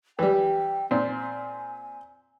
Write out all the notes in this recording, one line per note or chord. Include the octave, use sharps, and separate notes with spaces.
E3 G3 G5
A#2 C4 G#5